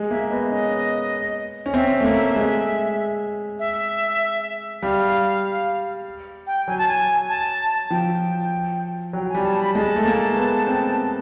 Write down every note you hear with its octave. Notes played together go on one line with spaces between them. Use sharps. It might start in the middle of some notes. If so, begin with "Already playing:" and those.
Already playing: G#3
A#3 E5
B3 D#5
C#4 D#5
C#4
C4 E5
A3
A#3
G#3
E5
G3 F5
G5
F#3 G#5
A5
G#5
A5
F3 G5
F#3 G5
G5
G#5
G3
A5
B5
G#3 A5
A3
A#3
B3
C4